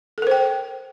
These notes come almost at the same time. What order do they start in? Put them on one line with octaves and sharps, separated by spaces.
A4 A#4 C5 G5